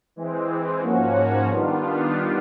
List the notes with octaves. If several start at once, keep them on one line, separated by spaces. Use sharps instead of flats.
E3 G#3 C4
G#2 F3 A#3 C#4 F#4
D#3 G3 B3 D4 F4